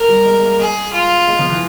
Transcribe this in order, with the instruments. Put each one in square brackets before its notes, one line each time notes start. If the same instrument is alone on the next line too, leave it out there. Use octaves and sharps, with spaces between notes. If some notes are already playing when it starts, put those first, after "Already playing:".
Already playing: [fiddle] A#4
[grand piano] G3
G#3
G#3
A#3
[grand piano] G#3 [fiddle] G#4
[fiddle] F4
[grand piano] G#3
F3
E3